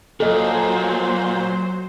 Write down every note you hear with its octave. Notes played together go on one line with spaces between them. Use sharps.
A#2 F#3 A4 C5 D#5